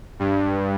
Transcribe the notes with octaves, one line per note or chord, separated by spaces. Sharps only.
G2